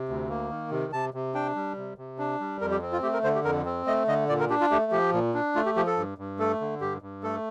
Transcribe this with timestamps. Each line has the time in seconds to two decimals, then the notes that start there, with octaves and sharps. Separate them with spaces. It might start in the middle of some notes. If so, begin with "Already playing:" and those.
Already playing: C3
0.09 D2
0.29 A#3
0.50 D#3
0.71 C3
0.93 C3 A5
1.14 C3
1.34 D4 G5
1.55 G3
1.77 C3
1.98 C3
2.19 D4
2.40 G3
2.61 F2 A#4
2.71 G4
2.82 C4
2.93 F4
3.03 A3 G4
3.13 A#4
3.24 D3 C5
3.35 G4
3.44 F2 A#4
3.65 C4
3.87 A3 D#5
4.08 D3 D#5
4.29 A#2 D5
4.40 A#4
4.50 D4 G4
4.61 F4
4.71 A3 G4
4.92 F3 G4
5.13 A#2
5.34 D4
5.55 A3 F4
5.66 G4
5.76 F3 G4
5.87 A4
5.97 G2
6.18 G2
6.39 A3 A4
6.61 D3
6.81 G2 G4
7.02 G2
7.23 A3 A4